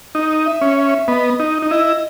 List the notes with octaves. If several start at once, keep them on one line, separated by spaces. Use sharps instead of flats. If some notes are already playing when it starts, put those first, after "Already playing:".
D#4
E5
C#4
E5
B3 D#5
D#4
D#4
E4 D#5